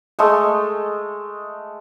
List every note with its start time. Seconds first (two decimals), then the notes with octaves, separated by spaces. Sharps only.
0.19 G#3 A3 A4 D#5